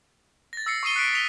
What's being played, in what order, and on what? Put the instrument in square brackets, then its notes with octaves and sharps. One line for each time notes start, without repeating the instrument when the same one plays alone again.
[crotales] A6 A#6
E6 A#6 C7 C#7
C#6 D#6 C7 D#7 G7
F#6 B6 D7
B6 F7 G7